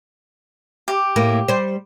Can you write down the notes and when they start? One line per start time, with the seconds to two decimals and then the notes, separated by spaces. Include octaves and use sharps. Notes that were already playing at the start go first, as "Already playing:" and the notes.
0.88 G4
1.16 A2 A#3
1.48 G3 C5